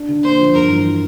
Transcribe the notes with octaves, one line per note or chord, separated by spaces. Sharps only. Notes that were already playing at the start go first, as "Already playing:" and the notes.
Already playing: D4
D3
A#3 C5
F3
G2 A#4
E3